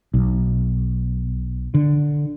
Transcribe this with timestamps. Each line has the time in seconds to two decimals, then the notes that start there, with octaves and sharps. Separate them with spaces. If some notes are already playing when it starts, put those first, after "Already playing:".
0.14 B1
1.74 D3